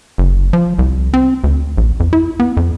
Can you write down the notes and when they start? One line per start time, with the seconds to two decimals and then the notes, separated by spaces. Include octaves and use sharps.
0.18 F#1
0.53 F3
0.79 C2
1.14 C4
1.44 D2
1.77 A#1
2.00 F2
2.13 E4
2.40 B3
2.57 F2